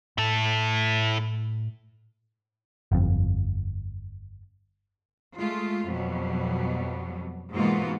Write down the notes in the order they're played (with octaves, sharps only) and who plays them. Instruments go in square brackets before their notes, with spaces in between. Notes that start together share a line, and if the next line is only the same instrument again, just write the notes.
[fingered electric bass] A2 [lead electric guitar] E4 A4
[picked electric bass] G1 F2
[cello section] G#3 A3 F4
F2 B2 F#3 G3
G#2 B2 E3 A#3 F4 F#4